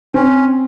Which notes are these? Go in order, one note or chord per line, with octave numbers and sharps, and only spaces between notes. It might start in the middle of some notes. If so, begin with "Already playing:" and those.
C4 C#4